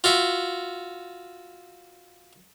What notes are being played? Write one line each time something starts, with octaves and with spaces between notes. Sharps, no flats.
F4 F#4 E5